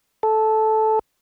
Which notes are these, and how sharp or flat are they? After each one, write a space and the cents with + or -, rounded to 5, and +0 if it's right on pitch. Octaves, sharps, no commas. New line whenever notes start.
A4 -10